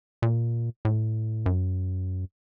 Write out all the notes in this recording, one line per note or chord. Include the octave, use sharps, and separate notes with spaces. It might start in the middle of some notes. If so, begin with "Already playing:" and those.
A#2
A2
F#2